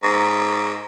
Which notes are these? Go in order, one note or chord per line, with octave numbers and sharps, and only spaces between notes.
G#2